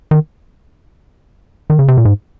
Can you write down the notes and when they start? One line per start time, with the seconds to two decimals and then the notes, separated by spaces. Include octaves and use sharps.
0.11 D#3
1.70 D#3
1.79 C#3
1.88 C3
1.97 A#2
2.05 G#2